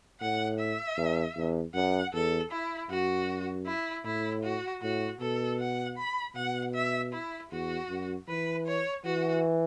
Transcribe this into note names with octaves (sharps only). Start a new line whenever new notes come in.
A2 F#5
E5
E2
E2
F#2 F#5
E2 A4
E4
F#2 F#4
E4
A2 E4
F#4
A2 F#4
B2 A4
F#5
B5
B2 F#5
E5
E4
E2 F#4
F#2
E3 B4
C#5
E3 F#4